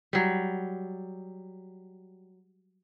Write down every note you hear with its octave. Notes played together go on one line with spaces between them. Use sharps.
F#3 G3